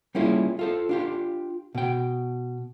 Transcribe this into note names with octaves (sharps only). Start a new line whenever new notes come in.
G3 A#3 C#4 E4 F4 G#4
F4 A4 C5
D4 F4 G4
B2 G5